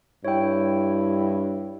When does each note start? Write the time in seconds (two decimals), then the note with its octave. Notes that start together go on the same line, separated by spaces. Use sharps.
0.25 G2 E4 C#5 G5